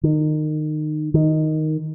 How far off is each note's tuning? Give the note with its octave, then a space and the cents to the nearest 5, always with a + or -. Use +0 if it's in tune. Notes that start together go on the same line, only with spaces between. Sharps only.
D#3 -25
D#3 +0